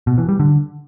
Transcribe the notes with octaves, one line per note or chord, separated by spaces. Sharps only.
B2
E3
G3
D3